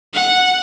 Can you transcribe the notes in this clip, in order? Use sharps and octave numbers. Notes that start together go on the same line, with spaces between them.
F#5